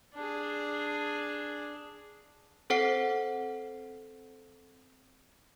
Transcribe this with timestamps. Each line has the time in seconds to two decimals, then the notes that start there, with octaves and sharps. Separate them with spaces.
0.15 D4 G#4
2.70 C4 A4 C5 F#5 C7